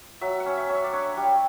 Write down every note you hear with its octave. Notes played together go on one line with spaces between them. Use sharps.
F#3 E5
F#5
C#4
E5
C#4
E5
D5
D4 C#5
G3